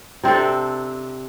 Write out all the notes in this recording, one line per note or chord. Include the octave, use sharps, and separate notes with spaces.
C3 C4 D4 A4